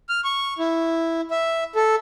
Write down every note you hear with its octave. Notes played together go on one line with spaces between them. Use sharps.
F6
C#6
E4
E5
A4